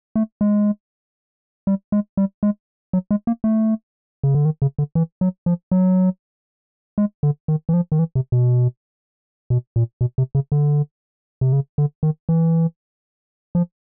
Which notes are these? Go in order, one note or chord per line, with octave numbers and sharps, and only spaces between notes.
A3
G#3
G3
G#3
G3
G#3
F#3
G#3
A#3
A3
C#3
D3
D#3
C#3
D3
E3
F#3
F3
F#3
G#3
D3
D#3
E3
F3
D#3
E3
C3
B2
B2
A#2
B2
C3
C#3
D3
C3
C#3
D3
D#3
E3
F3